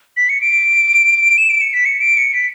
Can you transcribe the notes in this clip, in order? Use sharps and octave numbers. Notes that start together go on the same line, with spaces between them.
B6
C#7
D7
E7
D7
C#7
B6
C#7
D7
C#7
B6